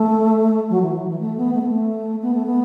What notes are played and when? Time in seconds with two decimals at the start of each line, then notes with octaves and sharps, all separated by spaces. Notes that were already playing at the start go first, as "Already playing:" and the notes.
Already playing: A3
0.70 F#3
0.82 E3
0.95 F#3
1.08 E3
1.21 A3
1.37 B3
1.54 A3
1.61 B3
1.68 A3
2.22 B3
2.34 A3
2.46 B3